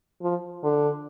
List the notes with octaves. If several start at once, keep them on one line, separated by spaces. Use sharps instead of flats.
F3
D3